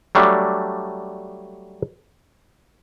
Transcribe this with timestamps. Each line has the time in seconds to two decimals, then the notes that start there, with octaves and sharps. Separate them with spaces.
0.15 F#3 G3 A3 D4